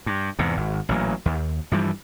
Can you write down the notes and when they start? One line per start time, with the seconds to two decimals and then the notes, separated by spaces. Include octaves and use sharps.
0.06 G2
0.39 E2 G#2 C3
0.57 G#1
0.89 A1 A#2 F#3
1.26 D#2
1.72 G2 E3 F3 G3